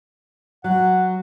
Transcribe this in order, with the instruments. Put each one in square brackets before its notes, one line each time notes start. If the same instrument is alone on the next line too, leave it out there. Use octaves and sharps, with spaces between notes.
[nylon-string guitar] F#3 [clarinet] F#5